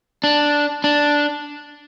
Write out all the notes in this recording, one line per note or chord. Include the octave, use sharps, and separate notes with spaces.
D4
D4